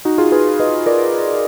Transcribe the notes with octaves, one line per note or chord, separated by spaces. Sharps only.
D#4 F#4
F4 G#4
G#4 B4
B4 D#5
A#4 D5